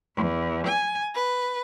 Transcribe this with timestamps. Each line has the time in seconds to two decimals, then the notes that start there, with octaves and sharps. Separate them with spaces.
0.16 E2
0.66 G#5
1.13 B4